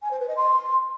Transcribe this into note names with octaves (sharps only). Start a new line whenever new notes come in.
G#5
C5
B4
D#5
C6